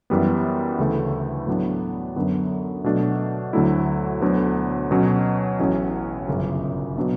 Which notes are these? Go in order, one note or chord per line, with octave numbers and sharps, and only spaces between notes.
F#2 E3 G3 B3
D2 C#3 E3 A3
A2 F#3 B3 D4
F#2 D3 F#3 B3
B2 F#3 A3 D4
D2 D3 F#3 A3 E4
D2 D3 F#3 B3
B2 F#3 C#4
A1 A2 F#3 C#4
G1 F#2 C#3
B2 F#3 B3 D4